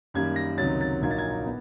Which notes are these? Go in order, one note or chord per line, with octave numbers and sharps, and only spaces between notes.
F#2 D#3 G3 A#3 G#6
A#6
C#2 C3 D#3 F#3 A6
A6
A#1 A#2 F#3 A#3 D#4 G#6
A6
G#6
B3